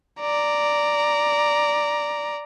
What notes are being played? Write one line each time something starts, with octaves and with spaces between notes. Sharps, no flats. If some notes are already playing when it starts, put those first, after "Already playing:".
D5 A#5